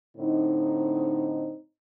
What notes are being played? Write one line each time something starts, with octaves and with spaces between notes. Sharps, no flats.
A2 D3 C4 D#4